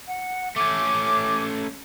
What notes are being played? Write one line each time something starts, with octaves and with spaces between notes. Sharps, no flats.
F#5
A3 C#4 D6